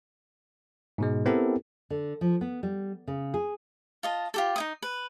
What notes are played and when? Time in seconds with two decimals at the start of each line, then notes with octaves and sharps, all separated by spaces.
0.98 G#2 B2 G#3
1.26 B3 C4 E4 G4 A4 A#4
1.90 D3
2.21 F3
2.41 B3
2.63 G3
3.07 C#3
3.34 G#4
4.03 F4 D#5 A5
4.34 F4 G4 A4
4.56 D#4 E4 D#6
4.82 B4